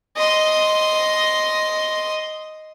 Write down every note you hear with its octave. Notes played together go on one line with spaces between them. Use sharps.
D#5 C6